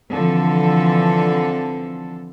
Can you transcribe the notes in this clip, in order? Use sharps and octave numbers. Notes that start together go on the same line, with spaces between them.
D3 E3 F3 C4 A4